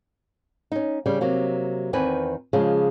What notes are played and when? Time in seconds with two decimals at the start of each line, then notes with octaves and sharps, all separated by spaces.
0.72 C#4 D#4
1.06 C#3 G3 C#4
1.21 C3 F#3 A#3
1.93 E2 D#3 C4 B4 G#5
2.53 C#3 F3 G#3 G#4